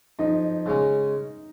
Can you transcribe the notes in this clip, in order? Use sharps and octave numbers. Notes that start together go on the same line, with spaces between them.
F2 D#4
C#3 G#3 C#4